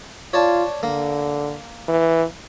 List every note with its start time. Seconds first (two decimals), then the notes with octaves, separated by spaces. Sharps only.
0.34 F4 C#5 D5 A5
0.83 D3 A#3
1.88 E3